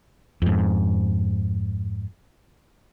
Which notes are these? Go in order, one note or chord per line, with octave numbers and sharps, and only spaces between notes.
F2 G#2